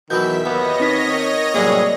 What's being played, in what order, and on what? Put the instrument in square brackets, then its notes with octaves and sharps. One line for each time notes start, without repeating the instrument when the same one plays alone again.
[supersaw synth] E2 E5 B6 [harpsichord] B2 E3 F#3 [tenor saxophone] D#3 [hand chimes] G6
[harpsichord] D#2 [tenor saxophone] B3 [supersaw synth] C#5 D#5 A#6
[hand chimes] C4 D#4 B6
[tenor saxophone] D#3
[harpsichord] C2 F#2 A2 [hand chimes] A#3 D5 [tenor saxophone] G#4